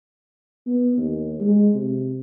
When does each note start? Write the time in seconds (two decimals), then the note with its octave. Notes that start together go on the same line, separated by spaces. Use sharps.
0.67 B3
0.98 D#2
1.41 G#3
1.74 C3